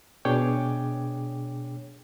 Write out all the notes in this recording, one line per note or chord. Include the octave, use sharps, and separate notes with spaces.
B2 D4 G#4 C#5 G5 D6